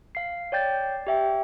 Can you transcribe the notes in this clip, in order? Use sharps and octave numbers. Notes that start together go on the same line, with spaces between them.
F5 C7
C#5 D5 G5 G6 A6
G4 E5 G5